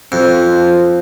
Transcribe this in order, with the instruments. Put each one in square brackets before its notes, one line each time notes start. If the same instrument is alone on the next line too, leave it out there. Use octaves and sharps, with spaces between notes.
[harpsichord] F2 [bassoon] F3